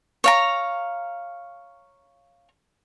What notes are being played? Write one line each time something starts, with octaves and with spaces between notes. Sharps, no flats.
C#5 F5 A#5